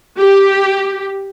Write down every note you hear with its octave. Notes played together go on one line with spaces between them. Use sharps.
G4